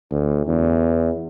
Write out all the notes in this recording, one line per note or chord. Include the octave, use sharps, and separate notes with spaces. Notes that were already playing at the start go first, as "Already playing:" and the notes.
D2
E2